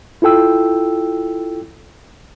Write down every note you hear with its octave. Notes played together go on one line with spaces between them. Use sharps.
E4 F4 A4 G5 E6